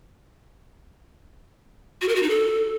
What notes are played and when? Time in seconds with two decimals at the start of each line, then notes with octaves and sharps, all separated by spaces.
2.02 F#4
2.09 A#4
2.16 F#4
2.23 D#4
2.30 A4